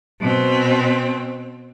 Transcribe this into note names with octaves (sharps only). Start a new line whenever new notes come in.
B2 C4